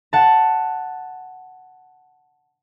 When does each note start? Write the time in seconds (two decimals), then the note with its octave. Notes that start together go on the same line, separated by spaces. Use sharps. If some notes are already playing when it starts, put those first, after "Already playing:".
0.13 F#5 A5